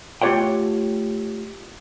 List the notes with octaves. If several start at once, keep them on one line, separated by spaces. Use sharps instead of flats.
A3 F4 G4 C#5 F#5 G5